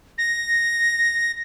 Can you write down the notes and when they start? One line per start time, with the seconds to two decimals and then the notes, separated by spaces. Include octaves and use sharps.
0.18 A#6